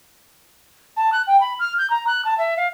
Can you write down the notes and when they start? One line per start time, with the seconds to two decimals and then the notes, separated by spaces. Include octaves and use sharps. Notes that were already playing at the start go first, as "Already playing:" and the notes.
0.96 A5
1.12 F#6
1.27 G5
1.40 B5
1.59 F6
1.78 G6
1.90 A#5
2.07 F#6
2.24 A5
2.38 E5
2.57 F5